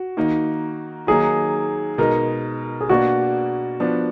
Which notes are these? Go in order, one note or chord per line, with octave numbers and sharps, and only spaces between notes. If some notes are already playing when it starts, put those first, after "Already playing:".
Already playing: F#4
D#3 A#3 D#4
D#3 F#3 A#3 D#4 G#4
B2 G#3 D#4 A#4
G#4
B2 A#3 D4 F#4
F3 B3 D4